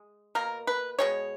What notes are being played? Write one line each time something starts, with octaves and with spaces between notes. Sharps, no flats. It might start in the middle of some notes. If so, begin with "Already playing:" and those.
Already playing: G#3
B2 A#3 A#4
B4
B2 G#3 C#5